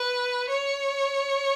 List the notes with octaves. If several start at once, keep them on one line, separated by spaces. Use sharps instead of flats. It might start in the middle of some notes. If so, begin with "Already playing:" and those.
Already playing: B4
C#5